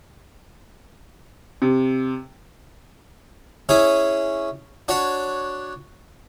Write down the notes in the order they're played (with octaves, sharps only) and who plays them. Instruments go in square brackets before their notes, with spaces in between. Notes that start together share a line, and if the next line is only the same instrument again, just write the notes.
[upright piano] C3
[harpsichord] C#4 E4 G#4 C#5
D4 F#4 C#5